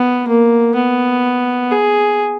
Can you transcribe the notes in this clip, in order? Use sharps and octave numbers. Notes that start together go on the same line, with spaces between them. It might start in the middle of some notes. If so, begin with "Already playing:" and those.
Already playing: B3
A#3
B3
G#4